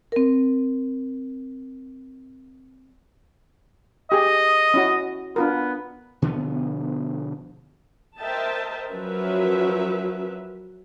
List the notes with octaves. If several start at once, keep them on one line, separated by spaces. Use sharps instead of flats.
C4 A#4
G4 G#4 D#5
C#4 E4 F#4
B3 D4 F4 A#4
B2 D3 F3 B3
A#4 C5 D#5 E5 G5 A5
F3 F#3 C#4 A#4 B4 E5